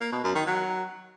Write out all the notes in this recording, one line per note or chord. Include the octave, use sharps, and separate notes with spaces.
A#3
B2
F#2
D#3
F#3